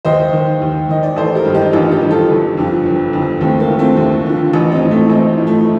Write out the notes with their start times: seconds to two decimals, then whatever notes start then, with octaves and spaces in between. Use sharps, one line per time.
0.05 D#2 C5 D#5
0.33 D#3
0.61 D#2
0.89 D#3 D#5
1.03 D5
1.16 A1 A4 C5
1.35 G4 A#4
1.45 G2 D#3
1.54 D#4 G4
1.72 A1 D4 F4
1.91 D#4 G4
2.01 G2 D#3
2.11 F4 A4
2.30 G1
2.57 F2 D3 F3
2.86 G1
3.13 F2 D3 F3
3.41 D#2 A3 C4
3.60 A#3
3.70 D3 F3
3.79 A3 C4
3.97 D#2
4.26 D3 F3
4.53 A1
4.72 C4 D#4
4.82 A2 F3
4.91 A3 C4
5.10 A1 C4 D#4
5.38 A2 F3
5.47 A3